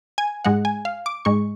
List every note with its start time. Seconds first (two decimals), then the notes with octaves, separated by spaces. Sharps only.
0.18 G#5
0.44 G#2 G#3 F#5
0.65 G#5
0.85 F5
1.06 D6
1.25 G#2 G#3 C#6